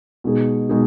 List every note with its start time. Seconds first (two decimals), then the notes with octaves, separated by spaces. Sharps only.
0.24 B2 G#3 D#4 G#4
0.69 B2 G#3 D#4 G#4